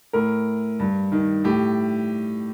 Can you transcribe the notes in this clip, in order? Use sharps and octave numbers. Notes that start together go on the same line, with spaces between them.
A2 A#4
G2
D#3
A2 G4